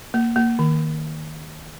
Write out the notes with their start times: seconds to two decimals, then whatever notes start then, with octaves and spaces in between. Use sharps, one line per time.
0.14 A#3
0.36 A#3
0.59 D#3